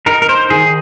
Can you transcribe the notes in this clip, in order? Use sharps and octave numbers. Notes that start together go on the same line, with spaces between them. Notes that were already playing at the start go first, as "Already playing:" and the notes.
D#4 A#4
A#4
C5
D#3 G#4